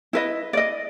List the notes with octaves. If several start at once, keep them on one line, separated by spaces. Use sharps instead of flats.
E4 B4 D#5
D5 D#5